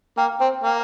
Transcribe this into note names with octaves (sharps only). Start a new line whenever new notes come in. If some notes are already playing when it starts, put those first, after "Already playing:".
A#3 G5
C4 G5
A#3 G5